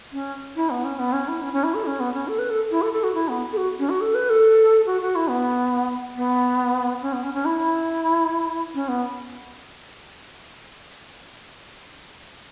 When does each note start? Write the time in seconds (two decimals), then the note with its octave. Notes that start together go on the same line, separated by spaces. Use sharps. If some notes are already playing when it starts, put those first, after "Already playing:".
0.12 C#4
0.56 E4
0.70 B3
0.84 C#4
0.99 B3
1.13 C#4
1.28 E4
1.42 C#4
1.53 C#4
1.64 E4
1.74 A4
1.85 C#4
2.00 B3
2.13 C#4
2.28 A4
2.39 B4
2.50 A4
2.71 E4
2.82 A4
2.93 A4
3.04 F#4
3.14 E4
3.28 B3
3.53 A4
3.57 F#4
3.79 C#4
3.89 F#4
4.01 A4
4.15 B4
4.30 A4
4.86 F#4
5.02 F#4
5.15 E4
5.29 B3
6.16 B3
7.02 C#4
7.13 B3
7.23 C#4
7.34 C#4
7.45 E4
8.74 C#4
8.88 B3